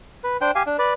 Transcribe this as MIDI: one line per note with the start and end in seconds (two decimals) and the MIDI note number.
0.24 0.37 71
0.41 0.51 62
0.41 0.51 72
0.41 0.51 79
0.55 0.63 67
0.55 0.63 77
0.55 0.63 80
0.66 0.77 62
0.79 0.94 71
0.79 0.94 74